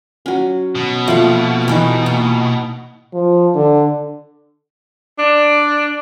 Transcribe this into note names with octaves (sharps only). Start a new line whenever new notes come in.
F#3 C#4
B2
F3 A3 A#3 F4
E3 G#3 D#4 G5
A#2
F3
D3
D4